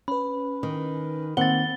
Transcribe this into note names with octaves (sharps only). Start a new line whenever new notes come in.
C#4 B4 B5
D#3
D#3 A#3 C4 F#5 A6 G7